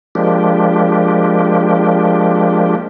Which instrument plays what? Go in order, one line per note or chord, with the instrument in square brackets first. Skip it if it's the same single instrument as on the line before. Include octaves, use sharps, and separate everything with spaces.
[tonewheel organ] F3 G#3 A#3 D4 G4